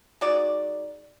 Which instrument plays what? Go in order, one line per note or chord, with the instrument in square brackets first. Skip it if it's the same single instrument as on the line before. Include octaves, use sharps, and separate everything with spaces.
[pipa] G#3 D#4 F#4 D5